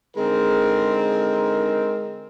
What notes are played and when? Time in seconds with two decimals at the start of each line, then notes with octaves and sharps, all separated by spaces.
0.17 D3 G#3 C4 D#4 A#4